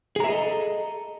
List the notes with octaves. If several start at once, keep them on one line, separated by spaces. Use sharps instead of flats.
G#4 A4 D#5 E5 A#5